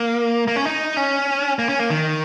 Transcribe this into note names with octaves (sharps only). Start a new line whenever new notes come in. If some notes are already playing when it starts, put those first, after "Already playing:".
Already playing: A#3
A#3
C#4
D#4
C#4
A#3
C#4
A#3
D#3